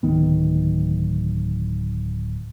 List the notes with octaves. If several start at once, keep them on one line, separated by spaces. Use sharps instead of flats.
D1 D#3 B3